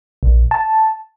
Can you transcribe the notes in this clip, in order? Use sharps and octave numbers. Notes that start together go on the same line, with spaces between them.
A#1
A5